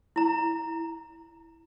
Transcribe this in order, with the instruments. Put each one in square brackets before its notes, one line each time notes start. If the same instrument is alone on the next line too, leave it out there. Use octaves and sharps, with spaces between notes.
[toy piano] E4 A#5